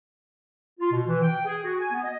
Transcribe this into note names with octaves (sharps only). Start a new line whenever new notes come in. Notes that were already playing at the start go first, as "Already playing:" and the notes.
F4
B2
E3
G5
G#4
F#4
G#5
B3
D#5